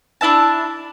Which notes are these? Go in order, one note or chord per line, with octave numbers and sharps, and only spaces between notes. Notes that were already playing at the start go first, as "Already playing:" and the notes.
D4 E4 E5 A5